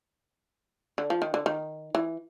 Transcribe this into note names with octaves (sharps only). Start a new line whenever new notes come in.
D3
F3
D#3
D3
D#3
E3